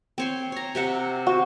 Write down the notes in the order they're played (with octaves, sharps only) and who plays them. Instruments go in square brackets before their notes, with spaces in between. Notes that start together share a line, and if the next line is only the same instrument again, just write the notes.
[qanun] C4 C#5 C6
C#5 A#5
C3 E5 F#5
[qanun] C4 [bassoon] F#4